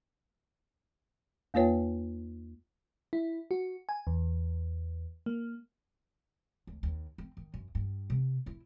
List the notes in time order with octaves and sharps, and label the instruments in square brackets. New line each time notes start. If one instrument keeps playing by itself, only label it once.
[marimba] E2 A#3 F4 B4 C#5 G5
[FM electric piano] E4
F#4
G#5
E2
A#3
[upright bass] D2
D#2
C4
D#3
F#2
G2
C3
E4